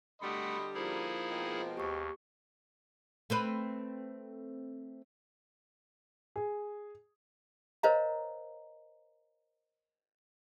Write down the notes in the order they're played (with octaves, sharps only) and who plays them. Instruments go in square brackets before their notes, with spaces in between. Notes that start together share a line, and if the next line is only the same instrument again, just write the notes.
[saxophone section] D3 G3 [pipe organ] A3 F#5 [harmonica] D#5 B5 C6
[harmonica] F3 A#3 [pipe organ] D#4 E4 G#4
[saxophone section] B2 G#3 C4
[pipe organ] D#2 [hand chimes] G4 C#6
[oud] A3 C4 B4
[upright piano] G#4
[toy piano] A#4 C5 C#5 D#5 F5 A#5